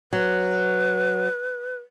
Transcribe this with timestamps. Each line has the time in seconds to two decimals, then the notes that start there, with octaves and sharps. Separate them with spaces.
0.13 F#3 B4